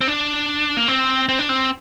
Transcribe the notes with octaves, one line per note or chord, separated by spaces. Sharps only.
C4
D4
A#3
C4
C4
D4
C4